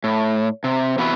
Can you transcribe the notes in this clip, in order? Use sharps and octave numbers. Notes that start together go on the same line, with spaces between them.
A2
C3
C3 E3 B3 E4 F#4 B4